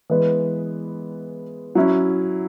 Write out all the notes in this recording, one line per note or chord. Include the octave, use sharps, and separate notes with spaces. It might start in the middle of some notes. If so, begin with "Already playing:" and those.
E3 G#3 B3 G#4 B4
F#3 C#4 E4